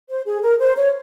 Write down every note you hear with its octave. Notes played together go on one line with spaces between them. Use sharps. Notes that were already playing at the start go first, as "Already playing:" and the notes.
C5
G#4
A#4
C5
C#5